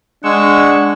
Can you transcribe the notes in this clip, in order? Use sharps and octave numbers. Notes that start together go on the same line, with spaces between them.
G#3 D4 F#5 C#6 E6